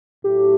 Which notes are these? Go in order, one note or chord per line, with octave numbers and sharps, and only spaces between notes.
A2 F#3 A3 G4